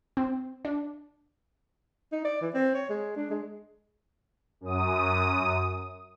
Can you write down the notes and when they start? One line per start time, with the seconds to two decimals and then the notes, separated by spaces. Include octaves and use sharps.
0.17 C4
0.65 D4
2.12 D#4
2.25 D5
2.41 E3
2.54 C4
2.74 C#5
2.89 G#3
3.16 D4
3.30 G#3
4.61 F#2 D#6